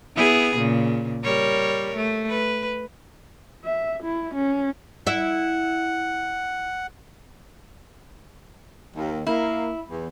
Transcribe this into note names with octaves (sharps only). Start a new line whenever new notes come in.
B3 E4 G#4
A#2 C#3
G3 A#4 C#5
A3
B4
E5
E4
C#4
E4 E5 F#5
D#2
A#3 E4
E2